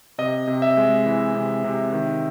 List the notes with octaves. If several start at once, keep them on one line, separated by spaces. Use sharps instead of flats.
C3 D#5
C3
E5
G#3
E3
C3
C3
D#3